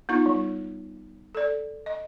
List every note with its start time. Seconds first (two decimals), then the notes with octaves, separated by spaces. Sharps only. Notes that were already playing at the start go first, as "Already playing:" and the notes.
0.09 B3 D#4 F4 C#6
0.26 G3
1.35 A4 D5
1.86 D#5